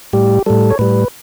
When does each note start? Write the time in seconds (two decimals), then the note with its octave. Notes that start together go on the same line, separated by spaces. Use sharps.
0.13 A2 G3 G4
0.46 A2 G3 A4
0.70 C#5
0.79 A2 G3 B4